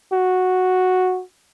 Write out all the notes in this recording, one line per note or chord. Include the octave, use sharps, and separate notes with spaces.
F#4